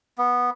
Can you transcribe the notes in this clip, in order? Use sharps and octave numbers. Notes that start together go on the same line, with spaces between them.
B3